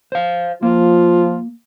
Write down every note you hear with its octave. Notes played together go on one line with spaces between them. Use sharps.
C5 F5
F3 A#3 F4